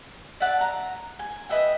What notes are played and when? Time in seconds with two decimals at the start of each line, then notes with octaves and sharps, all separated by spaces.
0.40 D5 E5 F#5 A5
0.61 A#5
1.19 G#5
1.49 B4 D#5 E5 G5